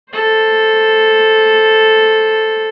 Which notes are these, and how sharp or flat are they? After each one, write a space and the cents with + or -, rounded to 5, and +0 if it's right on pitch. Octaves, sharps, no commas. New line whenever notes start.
A4 +0 C5 +15